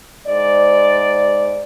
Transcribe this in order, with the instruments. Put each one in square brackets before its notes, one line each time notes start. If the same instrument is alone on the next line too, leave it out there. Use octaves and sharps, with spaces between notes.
[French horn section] G#2 C5 D5